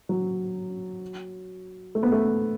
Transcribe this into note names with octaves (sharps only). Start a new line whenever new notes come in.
F#3
A3
B3
A3